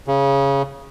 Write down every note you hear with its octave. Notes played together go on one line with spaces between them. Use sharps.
C#3